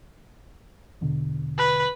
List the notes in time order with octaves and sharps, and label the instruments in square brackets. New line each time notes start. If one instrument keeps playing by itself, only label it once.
[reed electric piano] E2 B2 D3
[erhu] B4